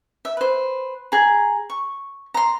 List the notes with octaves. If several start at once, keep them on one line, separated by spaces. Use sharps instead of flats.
E5
B4 C5
G#4 A#5
C#6
A#5 C6